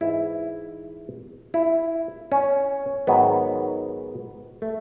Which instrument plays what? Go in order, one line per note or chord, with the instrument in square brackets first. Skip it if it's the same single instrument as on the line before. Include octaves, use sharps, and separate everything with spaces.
[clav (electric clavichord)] G#2 E3 E4
E4
C#4
G#2 D#3 F#3 B3
A3